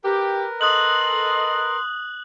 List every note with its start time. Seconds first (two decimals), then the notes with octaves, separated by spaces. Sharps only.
0.05 G4 A#4 B4
0.61 A4 D#5 C6 D#6 F#6 F#7